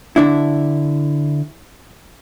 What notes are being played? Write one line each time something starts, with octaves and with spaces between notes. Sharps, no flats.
D3 D4 E4